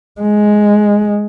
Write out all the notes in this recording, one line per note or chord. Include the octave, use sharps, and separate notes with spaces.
G#3